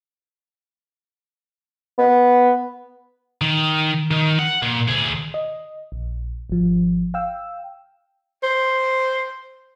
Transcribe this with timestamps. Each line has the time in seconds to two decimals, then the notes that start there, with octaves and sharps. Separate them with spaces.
1.99 B3
3.41 D#3
4.11 D#3
4.39 F#5
4.63 A#2
4.88 D2 G#4
5.34 D#5
5.92 A#1
6.50 G#1 F3
7.14 F5 G5 E6
8.43 C5